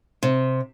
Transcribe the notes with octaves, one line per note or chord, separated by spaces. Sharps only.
C3